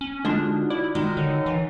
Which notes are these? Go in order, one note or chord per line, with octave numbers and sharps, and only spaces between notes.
C#4
D3 G#3 D4 D#4 F4 F#4 C6
E4 D5
D#3 G#3
D3 C#5
E3